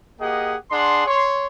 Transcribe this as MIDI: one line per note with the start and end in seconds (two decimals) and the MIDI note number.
0.20 0.55 58
0.20 0.55 67
0.20 0.55 68
0.20 0.55 75
0.20 0.55 78
0.71 1.06 62
0.71 1.06 68
0.71 1.06 78
0.71 1.06 84
1.07 1.47 73
1.07 1.47 84